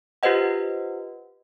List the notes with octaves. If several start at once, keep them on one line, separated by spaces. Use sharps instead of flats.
F4 G4 B4 C5 D#5 F#5